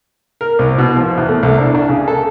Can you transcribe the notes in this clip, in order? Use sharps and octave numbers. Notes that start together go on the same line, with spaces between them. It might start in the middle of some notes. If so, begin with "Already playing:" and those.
A#4
C2
B2
F3
E2
A3
C2
D4
D4
C#3
A4